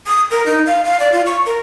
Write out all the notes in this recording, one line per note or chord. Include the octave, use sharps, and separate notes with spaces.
D#6
A#4
D#4
F5
F5
D5
F4
C#6
A#4